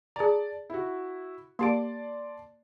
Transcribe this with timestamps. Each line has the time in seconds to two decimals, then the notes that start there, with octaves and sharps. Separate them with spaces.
0.16 G#4 D5 A5 A#5
0.70 E4 F#4
1.59 A#3 G4 D5 A5 C6 D7